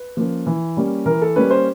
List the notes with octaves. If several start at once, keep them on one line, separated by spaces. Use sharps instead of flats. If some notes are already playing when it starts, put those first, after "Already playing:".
Already playing: B4
F3 A#3 C#4
E3
G3 A#3 C#4
E3 A#4
A4
G3 A#3 C#4 B4
C5